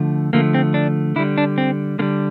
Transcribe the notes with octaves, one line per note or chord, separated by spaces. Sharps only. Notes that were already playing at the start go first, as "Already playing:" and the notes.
Already playing: D3 F3 A3
D3 F3 A3 A#3
C4
D4
D3 G3 E4
D4
C4
D3 G3 A#3